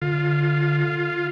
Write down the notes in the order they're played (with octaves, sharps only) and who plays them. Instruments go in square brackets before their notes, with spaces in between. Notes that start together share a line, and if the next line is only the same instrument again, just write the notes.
[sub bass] D3 [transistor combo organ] F4